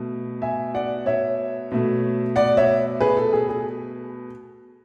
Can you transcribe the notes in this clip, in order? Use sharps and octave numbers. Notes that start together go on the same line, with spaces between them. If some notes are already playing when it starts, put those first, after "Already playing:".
Already playing: B2 A3
E5 G#5
D5 F#5
C#5 E5
B2 A3
D5 F#5
C#5 E5
G#4 B4
A4
G#4
G#4